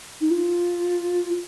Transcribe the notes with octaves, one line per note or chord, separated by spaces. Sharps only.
D#4
F4